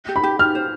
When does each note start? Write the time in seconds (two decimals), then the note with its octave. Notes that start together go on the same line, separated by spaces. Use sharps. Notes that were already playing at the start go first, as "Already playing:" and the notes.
0.09 G4
0.16 B5
0.23 G4
0.39 G4 F6
0.55 C5